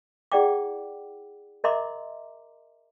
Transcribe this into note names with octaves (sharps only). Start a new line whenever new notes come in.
E4 G#4 D5 F#5 G5 D6
A#4 D#5 E5 A#5 C6 D6